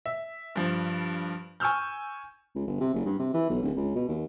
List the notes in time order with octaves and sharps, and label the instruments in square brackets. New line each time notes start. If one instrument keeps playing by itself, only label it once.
[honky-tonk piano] E5
G2 F3
G#5 C#6 E6 F6 G6
[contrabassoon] C#2
G1
C3
F#1
G2
C3
E3
B1
D1
C#2
B2
D#2